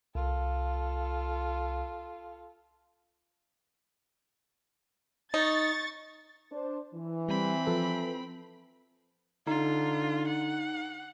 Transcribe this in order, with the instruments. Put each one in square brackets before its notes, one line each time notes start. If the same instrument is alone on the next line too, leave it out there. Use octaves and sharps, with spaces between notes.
[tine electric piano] C2 [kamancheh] F4 A4
[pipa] D#4 [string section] C#6 A6
[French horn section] D4 C5
E3
[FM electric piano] G3 [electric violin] C4 B5
[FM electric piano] F3 A4 B4
[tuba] D3 [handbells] D#4 [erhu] F4
[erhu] F#5